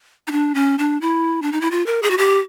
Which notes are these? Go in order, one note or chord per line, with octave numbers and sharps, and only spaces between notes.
D#4
D4
C#4
D4
E4
D4
D#4
E4
F4
A#4
G#4
F#4
G4